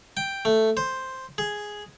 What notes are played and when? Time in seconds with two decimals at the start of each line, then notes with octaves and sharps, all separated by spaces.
0.17 G5
0.45 A3
0.77 C5
1.38 G#4